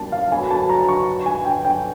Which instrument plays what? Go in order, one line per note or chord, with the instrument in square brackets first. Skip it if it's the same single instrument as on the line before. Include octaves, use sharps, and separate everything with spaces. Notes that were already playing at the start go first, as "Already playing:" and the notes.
Already playing: [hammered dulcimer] B2 G3 A#3 [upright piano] A5
[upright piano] F5
[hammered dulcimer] D3 F#3 B3 [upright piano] G#5
[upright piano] A5
A#5
C#6
G#5
G5
G5